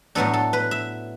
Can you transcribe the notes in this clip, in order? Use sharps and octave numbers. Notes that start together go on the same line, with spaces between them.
A2 F#3 B3 D4 A4
A4
B4
E5